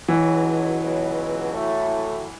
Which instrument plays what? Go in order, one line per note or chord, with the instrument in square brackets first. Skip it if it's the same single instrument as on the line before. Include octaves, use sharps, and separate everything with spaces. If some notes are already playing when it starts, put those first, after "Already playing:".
[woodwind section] C#2 B2 F#3 [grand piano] E3
[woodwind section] C#2 B2 F#3
A2 F#3 A3